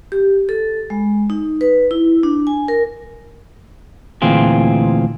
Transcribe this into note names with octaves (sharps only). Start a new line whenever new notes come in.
G4
A4
G#3
D#4
B4
E4
D4
G#5
A#4
D2 A#2 E3 C4 F4 G#4